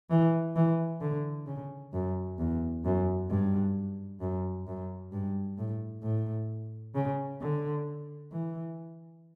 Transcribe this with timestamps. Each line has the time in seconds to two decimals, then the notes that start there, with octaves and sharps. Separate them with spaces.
0.10 E3
0.56 E3
1.01 D3
1.47 C#3
1.93 F#2
2.39 E2
2.85 F#2
3.30 G2
4.20 F#2
4.67 F#2
5.12 G2
5.58 A2
6.03 A2
6.95 C#3
7.41 D3
8.32 E3